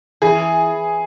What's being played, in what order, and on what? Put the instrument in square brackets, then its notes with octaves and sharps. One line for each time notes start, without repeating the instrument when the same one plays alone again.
[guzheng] E3 [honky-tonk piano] G#4